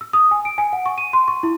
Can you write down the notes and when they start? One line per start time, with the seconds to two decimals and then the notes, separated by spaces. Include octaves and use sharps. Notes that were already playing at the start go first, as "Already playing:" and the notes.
0.01 E6
0.13 D#6
0.31 G#5
0.45 D7
0.58 G#5
0.73 F#5
0.86 C#6
0.98 D#7
1.13 C6
1.28 C#6
1.43 E4